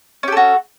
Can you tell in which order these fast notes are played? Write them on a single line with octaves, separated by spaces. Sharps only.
C#4 G4 A4 F#4